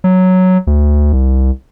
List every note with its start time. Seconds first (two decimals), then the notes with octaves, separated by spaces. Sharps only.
0.04 F#3
0.67 D2
1.13 C2